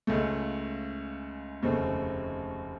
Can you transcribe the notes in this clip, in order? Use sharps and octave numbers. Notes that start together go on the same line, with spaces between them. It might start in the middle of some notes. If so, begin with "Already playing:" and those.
C#2 C#3 A3
F1 D#2 C#3 A3 C4